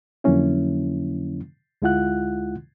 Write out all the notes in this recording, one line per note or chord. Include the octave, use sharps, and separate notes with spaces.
F2 D3 F#3 A#3 C#4 E4
D2 G#3 E4 F4 F#5 F#6